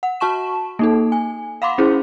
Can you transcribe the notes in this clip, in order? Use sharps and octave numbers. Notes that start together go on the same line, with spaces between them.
F#5
F#4 A5 C#6 E7
A#3 D#4 A4
G#5
F5 F#5 B5 C6 D6
C#4 E4 G#4 C5